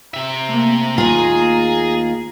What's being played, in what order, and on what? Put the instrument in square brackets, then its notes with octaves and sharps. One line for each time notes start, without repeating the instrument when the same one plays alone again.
[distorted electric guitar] C3 E5 [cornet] A#5
[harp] A3 A#3
[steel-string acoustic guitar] D#2 F4 [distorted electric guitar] G#4